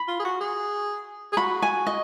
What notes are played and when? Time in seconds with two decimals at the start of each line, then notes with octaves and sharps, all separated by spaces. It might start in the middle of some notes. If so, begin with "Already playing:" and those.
Already playing: B5
0.08 F4
0.20 G#4
0.25 F#4
0.41 G#4
1.33 G#4
1.37 F#4 B5
1.62 G#5
1.87 D#5